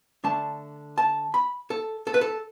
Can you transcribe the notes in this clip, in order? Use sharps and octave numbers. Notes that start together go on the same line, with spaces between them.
D3 A3 D4 A5
A5
B5
A4
A4
B4
A4